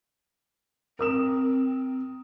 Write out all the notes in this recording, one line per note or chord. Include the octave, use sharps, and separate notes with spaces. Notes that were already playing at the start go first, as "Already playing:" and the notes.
C4 A#4 D#6 E7